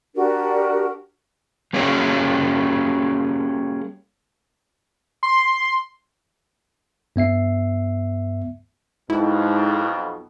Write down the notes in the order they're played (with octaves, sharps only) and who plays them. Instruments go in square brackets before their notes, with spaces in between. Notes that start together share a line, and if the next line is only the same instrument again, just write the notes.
[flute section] D4 F#4 G4 A#4
[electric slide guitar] G3 A#3 C#4 D#4 F#4 G#4
[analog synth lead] C6
[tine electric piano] G2 B3 E5 C7
[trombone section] B1 F2 B2 [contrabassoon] G#2 [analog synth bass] E4